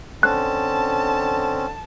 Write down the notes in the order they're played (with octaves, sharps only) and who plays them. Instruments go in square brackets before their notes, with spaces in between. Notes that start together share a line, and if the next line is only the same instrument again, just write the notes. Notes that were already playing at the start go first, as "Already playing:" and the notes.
[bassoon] D3 [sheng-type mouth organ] C4 C#4 [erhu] A5 [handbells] F#6